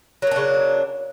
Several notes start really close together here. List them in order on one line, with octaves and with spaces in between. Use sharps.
F#3 A#3 D4 C#3